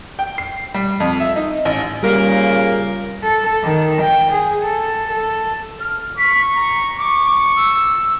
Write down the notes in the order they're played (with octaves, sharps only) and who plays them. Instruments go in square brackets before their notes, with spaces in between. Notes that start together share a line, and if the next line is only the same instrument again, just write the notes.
[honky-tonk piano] G5
C7
G3
F2
E5
D#4
A1
[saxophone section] A#2 A#3 A#4 [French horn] C#3 [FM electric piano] G3
[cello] A4
D#3
G5
G#4
A4
A4
[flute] F6
[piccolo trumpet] C#6 [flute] B6
[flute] A#5
[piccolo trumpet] C#6 [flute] D6
[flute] E6